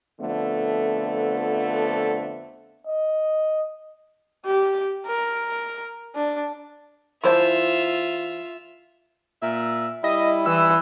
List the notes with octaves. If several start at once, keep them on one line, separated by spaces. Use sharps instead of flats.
F2 D3 F3 A3 B3
D#5
G4
A#4
D4
E3 F4 C5 E5 A5
A#2 E5
G3 E4 D#5
E3 E6